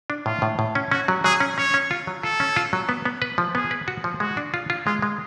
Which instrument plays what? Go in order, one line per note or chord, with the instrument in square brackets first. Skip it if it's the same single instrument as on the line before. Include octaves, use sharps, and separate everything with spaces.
[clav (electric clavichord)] D4
[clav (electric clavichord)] A2 [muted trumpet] F4
[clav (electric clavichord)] A2
A2
C#4
[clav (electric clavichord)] C#4 [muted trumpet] F#4
[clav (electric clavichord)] F#3
[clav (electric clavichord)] F#3 [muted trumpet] G#4
[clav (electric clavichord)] C#4
[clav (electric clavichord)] C#4 [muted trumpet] C#5
[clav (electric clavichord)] C#4
F4
F#3
[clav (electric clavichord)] F4 [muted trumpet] A4
[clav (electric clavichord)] C#4
F4
F#3
B3
B3
B4
F3
[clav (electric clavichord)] B3 [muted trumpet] G#4
[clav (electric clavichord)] B4
F#4
F3
[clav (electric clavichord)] G#3 [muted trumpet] F#4
[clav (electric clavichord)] D4
F4
F4
[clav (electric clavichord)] G#3 [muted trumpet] F4
[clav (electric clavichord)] G#3